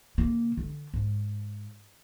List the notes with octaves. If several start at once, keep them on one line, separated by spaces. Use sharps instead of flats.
C#3 A#3
D3
G#2